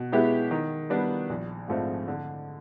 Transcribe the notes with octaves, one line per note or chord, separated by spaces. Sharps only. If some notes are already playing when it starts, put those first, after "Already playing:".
Already playing: B2
G#3 B3 E4 G4
D#3
G3 B3 D4
A#1
G#2 F3 A3 C4
D3